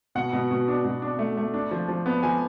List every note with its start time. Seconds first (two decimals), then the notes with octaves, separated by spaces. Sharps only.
0.15 B2 F#5
0.33 B2
0.51 B2
0.68 D4
0.85 B2
1.02 D4
1.19 A3
1.37 A3
1.54 D4
1.71 F3
1.88 F3
2.06 B3
2.23 F3 G#5